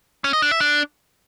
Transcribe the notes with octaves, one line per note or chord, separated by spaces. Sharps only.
C#4
D#5
D4
E5
D4